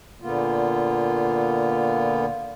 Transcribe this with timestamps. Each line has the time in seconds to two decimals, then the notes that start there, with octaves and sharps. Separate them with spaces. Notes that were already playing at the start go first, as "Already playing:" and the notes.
0.22 A#2 D3 A#3 B3 F4